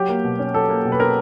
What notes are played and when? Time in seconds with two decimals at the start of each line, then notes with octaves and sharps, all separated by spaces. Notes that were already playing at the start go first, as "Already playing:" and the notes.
Already playing: F#3 G4
0.09 A#3
0.24 B2
0.39 C#4
0.54 F#3 A4
0.69 A#3
0.85 B2
0.92 B4
1.00 C#4 A#4